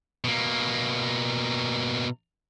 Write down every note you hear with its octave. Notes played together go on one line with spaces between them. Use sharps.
B2 A#3